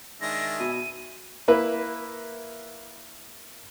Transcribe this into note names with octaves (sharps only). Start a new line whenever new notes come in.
D#3 G#3 D4 E5 G#5 A#6
B2 D#7
A#3 E4 B4